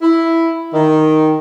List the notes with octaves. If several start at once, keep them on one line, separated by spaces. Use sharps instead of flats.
E4
D#3